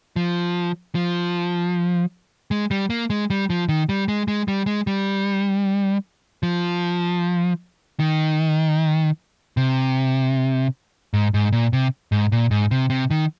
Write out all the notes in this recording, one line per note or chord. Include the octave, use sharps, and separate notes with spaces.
F3
F3
G#3
G3
A#3
G#3
G3
F3
D#3
G3
G#3
G#3
G3
G#3
G3
F3
D#3
C3
G#2
G#2
A#2
C3
G#2
A#2
G#2
C3
C3
D#3